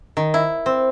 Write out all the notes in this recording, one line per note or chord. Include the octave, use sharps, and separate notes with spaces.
D#3
E4
C4